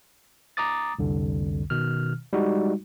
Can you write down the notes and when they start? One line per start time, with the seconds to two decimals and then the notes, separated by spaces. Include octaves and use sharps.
0.57 A#5 D6 D#6 A6
0.99 C2 F2 D3
1.70 B2 D#3 F6
2.33 G3 G#3 D#4 F#4